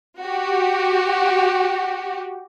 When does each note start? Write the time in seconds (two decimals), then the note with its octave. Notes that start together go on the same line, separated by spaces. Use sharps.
0.21 F#4 G4